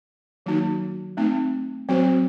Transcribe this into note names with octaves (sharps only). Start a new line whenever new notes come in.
D#3 F#3 A#3 D#4 F#4
A3 C4 D#4
F#3 C4 F#4 C5